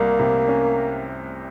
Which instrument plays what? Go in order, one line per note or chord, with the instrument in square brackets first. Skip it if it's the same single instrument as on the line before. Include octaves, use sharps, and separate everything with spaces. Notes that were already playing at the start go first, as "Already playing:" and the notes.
Already playing: [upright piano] C2 G3 [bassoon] A#3
[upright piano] C3
C#4